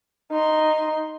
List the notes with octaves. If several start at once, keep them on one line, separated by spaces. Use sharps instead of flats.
D#4 C6